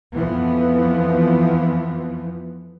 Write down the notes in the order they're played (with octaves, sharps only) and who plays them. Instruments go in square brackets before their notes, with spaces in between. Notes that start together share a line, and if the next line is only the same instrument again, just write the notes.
[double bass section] F2 E3 F3 B3